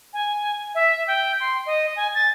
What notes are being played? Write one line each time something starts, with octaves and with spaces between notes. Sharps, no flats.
G#5
E5
G5
C6
D#5
G#5
A6